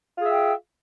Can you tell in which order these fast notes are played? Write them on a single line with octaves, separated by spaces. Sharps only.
F4 G#4 E5 G5